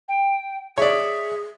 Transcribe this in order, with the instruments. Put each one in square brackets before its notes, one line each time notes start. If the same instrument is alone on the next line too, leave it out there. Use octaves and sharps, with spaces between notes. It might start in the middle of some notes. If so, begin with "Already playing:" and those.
[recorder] G5
[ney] G#4 [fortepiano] C#5 D5 [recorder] E5